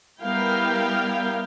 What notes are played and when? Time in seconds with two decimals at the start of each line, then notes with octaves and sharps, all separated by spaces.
0.21 G3 B3 E4 A#4 F5 G5